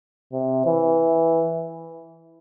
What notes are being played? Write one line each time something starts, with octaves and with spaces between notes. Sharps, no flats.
C3
E3